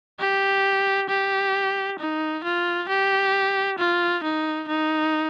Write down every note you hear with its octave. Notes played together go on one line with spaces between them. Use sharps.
G4
G4
D#4
F4
G4
F4
D#4
D#4